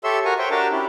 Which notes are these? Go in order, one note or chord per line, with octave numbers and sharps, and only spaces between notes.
G4 A4 C#5 E5 C6 E6
F#4 A#4 G#5 A#5 C#6
C5 C#5 E5 G5
D4 F#4 G4 A#4 G5 A5
C#4 E4 G4